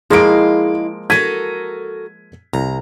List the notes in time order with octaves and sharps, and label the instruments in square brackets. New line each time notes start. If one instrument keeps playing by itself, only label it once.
[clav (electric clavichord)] F3 G#3 A#3 [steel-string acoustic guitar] E4 D#5 F5 [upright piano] G#4 D7
[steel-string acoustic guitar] F#4 A4 A#4 [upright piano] G#6 B6 D#7
[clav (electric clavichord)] C2 [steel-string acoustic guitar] A#5